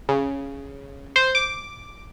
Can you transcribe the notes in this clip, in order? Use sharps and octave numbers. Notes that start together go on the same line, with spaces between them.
C#3
C5
D6